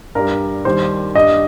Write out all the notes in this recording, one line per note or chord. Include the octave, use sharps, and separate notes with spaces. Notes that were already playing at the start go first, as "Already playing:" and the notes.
G2 G3 A#4
D#2 D#3 G3 C5
G2 G3 D#5